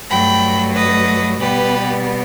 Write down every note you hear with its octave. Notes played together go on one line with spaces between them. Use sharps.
G2 F#3 A3 G5 B5
B4 D#5
B2 G3 B3 G4 B4